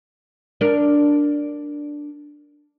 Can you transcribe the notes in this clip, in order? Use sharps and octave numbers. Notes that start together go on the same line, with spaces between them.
D4 A#4